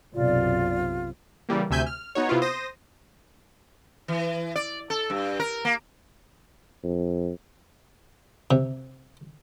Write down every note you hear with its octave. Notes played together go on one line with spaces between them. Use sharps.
B1 F#2 C3 F4 D5
C#3 E3 G3 A#3
D2 C3 E5 G#5 G6
F6
B3 D#4 F#4 C#5
C3 B3 E4 F4
C5 D#6 A#6
E3
D5
A4
G2
A#4
A#3
F2
C3